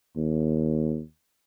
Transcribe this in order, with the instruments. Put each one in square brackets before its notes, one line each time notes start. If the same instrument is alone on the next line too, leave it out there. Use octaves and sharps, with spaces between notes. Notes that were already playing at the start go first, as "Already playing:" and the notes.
[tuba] D#2